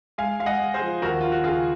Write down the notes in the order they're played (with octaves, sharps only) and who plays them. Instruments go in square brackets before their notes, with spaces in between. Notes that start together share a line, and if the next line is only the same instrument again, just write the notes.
[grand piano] G#3 F5 G#5
G#3 F5
D#5 F#5
G#3
G#4 C5
F3
D#2 F#4 A#4
D#2 F4
F#4
C#3 F4 G#4